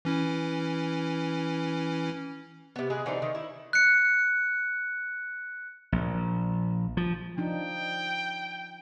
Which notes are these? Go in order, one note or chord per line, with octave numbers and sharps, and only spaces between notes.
E3 C#4 E4
C3 B3
G#3 G#4 B4
D3 E3 C4 D#4
D#3
E4
F#6 C#7
A#1
F3
F3 D4 D#4 G5